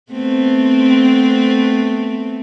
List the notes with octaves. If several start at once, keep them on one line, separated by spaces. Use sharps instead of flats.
A3 B3 C4